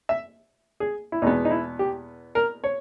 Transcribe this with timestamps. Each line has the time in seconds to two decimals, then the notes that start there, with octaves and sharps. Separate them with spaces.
0.09 E5
0.80 G#4
1.12 E4
1.22 E2 B2 G#3 B3 D#4
1.45 D#4
1.51 E4
1.79 G4
2.35 A#4
2.64 C#5